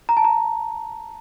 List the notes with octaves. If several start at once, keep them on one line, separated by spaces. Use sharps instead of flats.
A#5
A5
A#5